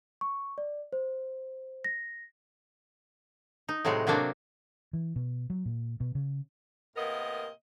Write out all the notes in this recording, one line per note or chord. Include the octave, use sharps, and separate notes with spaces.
C#6
D5
C5
A#6
D#4
A2 C3 F#3 G#3 F#5
C3 F#3 A#3 D4 F#4
E3
B2
F#3
A#2
B2
C#3
A2 C3 A#3 B3 A#4 D#5